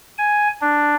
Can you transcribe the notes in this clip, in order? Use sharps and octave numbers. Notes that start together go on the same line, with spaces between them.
G#5
D4